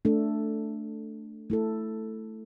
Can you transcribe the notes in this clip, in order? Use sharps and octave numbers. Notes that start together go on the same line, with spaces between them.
A3 D4 A4
A3 E4 A4